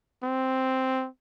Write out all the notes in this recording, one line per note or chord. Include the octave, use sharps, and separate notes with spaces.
C4